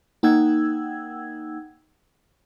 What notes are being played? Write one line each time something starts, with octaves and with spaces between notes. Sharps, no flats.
A#3 D#4 F#5 G5 E6 G#6